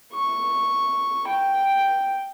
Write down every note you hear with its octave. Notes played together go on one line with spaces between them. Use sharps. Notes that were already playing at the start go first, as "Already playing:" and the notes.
C#6
G5